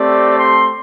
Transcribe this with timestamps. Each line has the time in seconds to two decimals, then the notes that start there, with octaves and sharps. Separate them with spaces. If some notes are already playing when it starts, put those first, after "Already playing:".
Already playing: A3 C4 G4 D5
0.38 C6